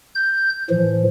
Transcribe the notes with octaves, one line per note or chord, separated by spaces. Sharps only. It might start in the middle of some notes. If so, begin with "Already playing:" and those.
G6
A2 E3 F3